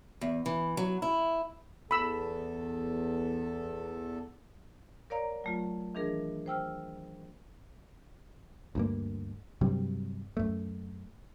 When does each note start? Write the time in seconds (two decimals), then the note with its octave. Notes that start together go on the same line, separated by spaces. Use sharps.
0.21 E2
0.46 E3
0.77 F#3
1.02 E4
1.91 E2 A4 B5 E6
5.10 A#4 C#5 D5 F5 A#5
5.44 F#3 A3 F4
5.95 D#3 E3 D4 G#4 A#4
6.46 C5 G5 E6 F6
8.75 D2 G2 A#3
9.61 G2 C3 F#3 G3
10.37 F#2 A3